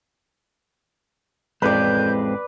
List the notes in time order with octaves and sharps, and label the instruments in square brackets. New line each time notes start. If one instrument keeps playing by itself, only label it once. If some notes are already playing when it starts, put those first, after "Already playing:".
[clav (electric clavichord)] A1 F2 [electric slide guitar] G#3 C4 [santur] B4 D5 [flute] G6